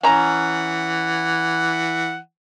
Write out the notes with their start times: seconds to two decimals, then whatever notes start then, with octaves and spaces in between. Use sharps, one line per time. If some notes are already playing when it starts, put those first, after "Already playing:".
0.03 E3 C#4 F#5 A#5